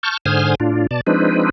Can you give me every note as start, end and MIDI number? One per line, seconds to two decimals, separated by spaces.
0.03 0.17 81
0.03 0.17 85
0.03 0.17 89
0.03 0.17 91
0.26 0.55 44
0.26 0.55 50
0.26 0.55 72
0.26 0.55 80
0.26 0.55 87
0.26 0.55 89
0.60 0.87 45
0.60 0.87 62
0.60 0.87 65
0.91 1.01 47
0.91 1.01 74
0.91 1.01 81
1.07 1.50 53
1.07 1.50 56
1.07 1.50 60
1.07 1.50 62
1.07 1.50 63
1.07 1.50 71